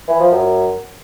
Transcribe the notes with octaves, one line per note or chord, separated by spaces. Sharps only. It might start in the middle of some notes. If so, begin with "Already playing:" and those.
E3
F3
F#2